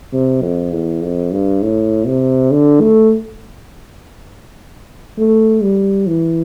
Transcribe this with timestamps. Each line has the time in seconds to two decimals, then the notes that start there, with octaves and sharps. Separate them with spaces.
0.13 C3
0.43 F2
0.72 E2
1.02 F2
1.32 G2
1.62 A2
2.07 C3
2.51 D3
2.81 A3
5.19 A3
5.63 G3
6.07 E3